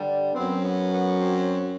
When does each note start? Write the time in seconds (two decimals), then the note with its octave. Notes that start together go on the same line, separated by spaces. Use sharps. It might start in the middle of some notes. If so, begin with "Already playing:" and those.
Already playing: G2 D3 G3
0.34 F#2 F#3 B3 C4
0.63 B3
0.92 B3
1.20 C4